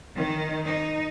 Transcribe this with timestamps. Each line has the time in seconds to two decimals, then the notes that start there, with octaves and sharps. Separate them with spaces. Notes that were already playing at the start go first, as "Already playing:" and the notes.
0.16 D#3
0.65 D#4